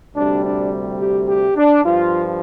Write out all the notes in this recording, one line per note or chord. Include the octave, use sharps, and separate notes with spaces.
D2 C3 G3 D4
D4
G4
G4
D4
G2 F3 F4